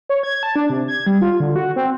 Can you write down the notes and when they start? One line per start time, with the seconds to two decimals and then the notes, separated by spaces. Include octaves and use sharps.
0.09 C#5
0.23 G#6
0.43 A5
0.56 D4
0.70 C3
0.88 G#6
1.07 G3
1.21 F4
1.40 D3
1.56 F#4
1.76 C4